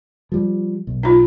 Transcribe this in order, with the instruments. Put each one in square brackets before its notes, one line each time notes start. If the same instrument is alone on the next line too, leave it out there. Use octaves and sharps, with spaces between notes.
[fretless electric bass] F3 G3
B1
[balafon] D#4 F4